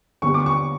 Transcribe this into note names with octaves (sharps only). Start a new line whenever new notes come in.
D3 G3 B3 C#6
D6
C#6